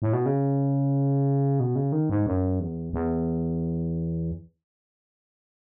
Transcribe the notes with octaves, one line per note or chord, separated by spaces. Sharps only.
A2
B2
C#3
B2
C#3
D#3
G#2
F#2
E2
E2